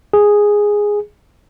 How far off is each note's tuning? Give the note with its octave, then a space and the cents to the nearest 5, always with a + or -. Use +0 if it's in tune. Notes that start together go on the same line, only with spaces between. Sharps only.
G#4 -5